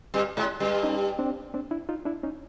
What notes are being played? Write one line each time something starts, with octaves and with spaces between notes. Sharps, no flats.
G2 G3
G#2 G#3
G2 G3
C#4 D#4
C4 D4
C4 D4
D4 E4
D#4 F4
D4 E4
C#4 D#4